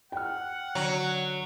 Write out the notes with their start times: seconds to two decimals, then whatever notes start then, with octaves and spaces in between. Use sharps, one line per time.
0.12 F#5 G5 F6
0.75 D3 F#3